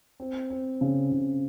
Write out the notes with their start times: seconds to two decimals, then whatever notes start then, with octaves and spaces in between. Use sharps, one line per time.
0.20 C4
0.50 C4
0.81 C#3
1.12 C#3